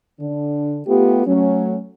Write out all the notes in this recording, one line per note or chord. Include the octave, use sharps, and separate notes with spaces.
D3 D4
A3 B3 F4 G4
F#3 A3 C#4